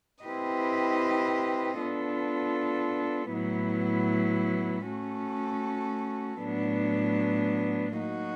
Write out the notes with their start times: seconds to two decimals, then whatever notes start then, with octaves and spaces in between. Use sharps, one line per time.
0.25 C4 E4 G4 B4 D#5
1.79 B3 D4 F4 A4
3.33 A2 F#3 B3 E4
4.87 A3 C#4 F#4 A4
6.41 A2 F#3 B3 D4
7.95 F#3 A#3 D#4 F#4